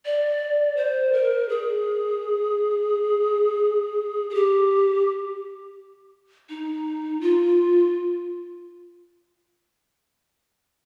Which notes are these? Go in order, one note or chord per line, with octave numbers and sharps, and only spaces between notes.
D5
C5
A#4
G#4
G#4
G4
D#4
F4